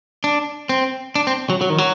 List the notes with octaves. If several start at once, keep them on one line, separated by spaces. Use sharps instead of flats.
D4
C4
D4
C4
F#3
F#3
D#3
F#3